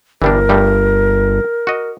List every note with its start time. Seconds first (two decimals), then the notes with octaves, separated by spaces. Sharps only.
0.22 G1 E3 G3 D4 A#4
0.49 G2 G3 A3
1.67 F#4 D#5